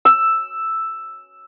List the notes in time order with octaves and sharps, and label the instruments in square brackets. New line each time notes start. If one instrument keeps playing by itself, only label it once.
[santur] E6